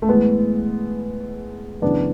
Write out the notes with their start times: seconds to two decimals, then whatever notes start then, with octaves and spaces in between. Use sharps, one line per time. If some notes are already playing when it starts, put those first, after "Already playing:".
0.02 A3
0.09 A2 E3 G#3 B3
1.82 F#2 C#3 E3 B3 D4